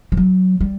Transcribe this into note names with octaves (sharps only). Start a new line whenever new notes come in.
F3
F#3
G3